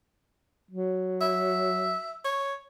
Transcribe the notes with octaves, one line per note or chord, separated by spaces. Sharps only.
F#3
E5
C#5